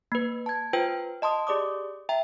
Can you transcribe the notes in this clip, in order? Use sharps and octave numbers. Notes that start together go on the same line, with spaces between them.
A#3 B4
A5 G#6
F4 B4 C5 G5
D#5 A5 C6 D#6
G4 G#4 D5 D6 D#6
E5 G5 A#5